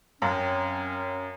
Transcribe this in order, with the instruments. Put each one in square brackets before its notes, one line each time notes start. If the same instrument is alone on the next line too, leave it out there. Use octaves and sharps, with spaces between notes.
[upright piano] F#2 [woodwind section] F#3 C4 C#4 [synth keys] C#5 F5 G5